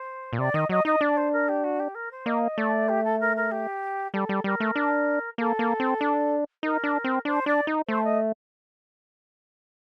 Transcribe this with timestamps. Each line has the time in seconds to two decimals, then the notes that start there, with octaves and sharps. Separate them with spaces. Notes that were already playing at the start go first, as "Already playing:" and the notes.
Already playing: C5
0.33 A#2
0.39 C3 D5
0.54 D#3 D#5
0.69 F#3 D#5
0.85 D#4 D#5
1.01 D4 D5
1.17 C5
1.32 A#4
1.48 G4
1.63 F#4
1.79 G4
1.94 A#4
2.11 C5
2.26 A#3 D#5
2.57 A3 D5
2.88 G4
3.04 A4
3.20 A#4
3.36 A#4
3.51 G4
4.13 G3 A4
4.29 G3
4.44 G3 A#4
4.60 A3
4.76 D4
5.38 A#3 A4
5.59 A#3
5.80 C4
6.01 D4
6.63 D#4 A#4
6.84 D4
7.04 C4
7.25 D4 C5
7.46 D4 D5
7.67 D#4
7.88 A3 C5
8.04 D#5